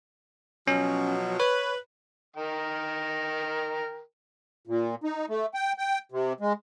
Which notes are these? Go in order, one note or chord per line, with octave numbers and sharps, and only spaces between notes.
B2 F3 F#3 C#4
B4 C#5
D#3 A#4 G5
A#2
D#4
A3
G5
G5
C3
G#3